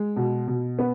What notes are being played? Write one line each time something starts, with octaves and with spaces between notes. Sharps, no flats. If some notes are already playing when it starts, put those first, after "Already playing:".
Already playing: G#3
B2
B2
B3